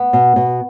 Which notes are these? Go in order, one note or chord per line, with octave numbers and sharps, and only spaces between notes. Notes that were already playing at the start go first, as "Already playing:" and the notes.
Already playing: B3
B2
B2